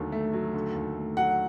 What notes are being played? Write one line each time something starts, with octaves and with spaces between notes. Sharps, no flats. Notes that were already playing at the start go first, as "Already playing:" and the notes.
Already playing: D#2 D3 F#3 A3
A3
F#3
D3
D#2
A3
F#3 F#5